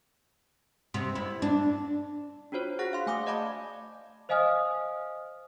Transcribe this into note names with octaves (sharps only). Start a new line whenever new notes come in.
C3
E4
D4
D4 F4 F#4 C5 C#5
G#4 F#5 F#6 A#6
F5 C6
A3 G#5 D6 D#6
D5 D#5 F5 A5 B5 D6
C5 D#5 F5 G#5 D#6 F6